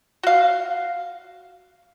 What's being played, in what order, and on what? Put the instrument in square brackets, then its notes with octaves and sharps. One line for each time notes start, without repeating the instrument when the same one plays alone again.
[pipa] F#4 F5